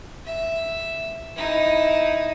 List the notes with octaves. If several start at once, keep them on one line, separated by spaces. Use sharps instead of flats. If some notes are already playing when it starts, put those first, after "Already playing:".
E5
D#4 E4